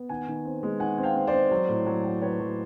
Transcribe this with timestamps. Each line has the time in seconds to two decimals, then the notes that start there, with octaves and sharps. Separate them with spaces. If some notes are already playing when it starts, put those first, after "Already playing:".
Already playing: B3
0.09 D#3 F#5 G#5
0.28 D#3
0.45 C4
0.63 G#3
0.80 D#3 F#5 G#5
0.98 C4
1.03 F5 G5
1.16 C4
1.27 C5 D5
1.33 C4
1.51 F#3
1.69 A2
1.86 F#3
2.04 F#3
2.21 F#3 B4 C#5
2.40 F#3